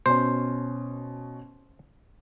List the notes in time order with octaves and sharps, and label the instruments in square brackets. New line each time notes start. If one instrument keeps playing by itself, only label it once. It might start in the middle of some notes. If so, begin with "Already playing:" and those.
[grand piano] B2 C#4 [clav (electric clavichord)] C5